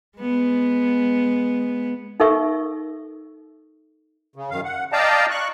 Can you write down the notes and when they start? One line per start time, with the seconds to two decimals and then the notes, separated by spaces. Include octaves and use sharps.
0.18 G#3 B3
2.20 D#4 A4 A#4 E5 C#6
4.36 C#3
4.51 F#2 D#3 F5
4.64 F#5
4.93 D5 D#5 F5 G5 A5 A#5
5.30 C#6 F#6